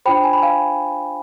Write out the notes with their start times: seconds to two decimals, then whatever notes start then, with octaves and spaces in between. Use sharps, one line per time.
0.05 D4 F4 C5 G5 B5
0.24 G#5
0.33 B5
0.43 F5 G#5